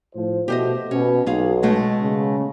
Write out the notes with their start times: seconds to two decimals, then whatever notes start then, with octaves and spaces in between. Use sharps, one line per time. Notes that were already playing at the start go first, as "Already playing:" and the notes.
0.15 A2 F3 C5
0.48 B2 A3 G4 C5 D#5
0.91 B2 C#4
1.26 B1 F4 G#4 F5
1.63 B2 G#3 A3
2.00 C#3